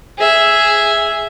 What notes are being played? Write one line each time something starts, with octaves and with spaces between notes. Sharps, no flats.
G#4 E5